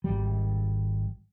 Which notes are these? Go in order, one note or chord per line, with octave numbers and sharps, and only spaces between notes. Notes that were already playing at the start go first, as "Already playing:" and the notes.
G#1 G3